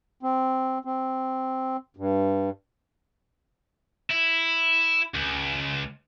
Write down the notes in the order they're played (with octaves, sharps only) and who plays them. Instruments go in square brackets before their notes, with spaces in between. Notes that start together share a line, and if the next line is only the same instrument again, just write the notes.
[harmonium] C4
C4
G2
[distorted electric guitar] E4
C#2